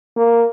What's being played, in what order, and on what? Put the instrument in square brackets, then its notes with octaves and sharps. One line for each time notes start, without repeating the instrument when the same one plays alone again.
[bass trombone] A#3